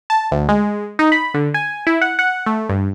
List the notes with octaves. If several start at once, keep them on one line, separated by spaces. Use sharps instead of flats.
A5
D2
G#3
D#4
B5
D3
G#5
E4
F#5
F#5
A3
G2